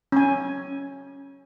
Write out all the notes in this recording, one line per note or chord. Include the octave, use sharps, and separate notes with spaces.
C#4 G#5